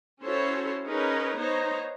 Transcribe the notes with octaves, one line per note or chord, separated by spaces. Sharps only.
C#4 E4 F#4 A4 C5 C#5
C#4 D#4 G#4 A#4 B4
B3 D#4 C5 C#5 A#5